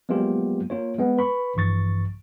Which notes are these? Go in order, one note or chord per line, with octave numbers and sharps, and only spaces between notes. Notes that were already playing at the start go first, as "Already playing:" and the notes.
F#3 G#3 A#3 B3 F4 G4
A#3 F4 C#5
G#3 B3
B4 B5 C#6
A#1 G2 E3 C#6 A6